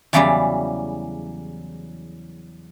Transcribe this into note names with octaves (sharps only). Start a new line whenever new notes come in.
E2 C#3 E3 F#3 G3 D5